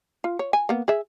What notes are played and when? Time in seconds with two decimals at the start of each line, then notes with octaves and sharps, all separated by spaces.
0.24 F4
0.39 C#5
0.53 G#5
0.69 A#3 B3
0.88 G#4 E5